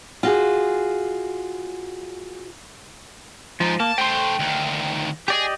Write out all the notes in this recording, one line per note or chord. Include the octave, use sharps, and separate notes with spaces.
F4 F#4 G#4
F3 G#3 D#4
A#3 A5
A3 C5 G5 C6
D2 D#3
G4 G#4 D5 D#5